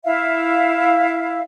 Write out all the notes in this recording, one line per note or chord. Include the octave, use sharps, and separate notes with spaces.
E4 E5 F5